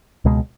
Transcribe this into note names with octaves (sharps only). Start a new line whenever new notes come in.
C#2 B2 G#3